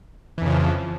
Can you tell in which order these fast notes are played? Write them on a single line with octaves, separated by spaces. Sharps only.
E3 F2 C#3 F3